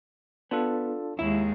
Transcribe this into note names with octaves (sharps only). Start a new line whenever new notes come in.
B3 D4 F4 A4
D#2 G#3 E4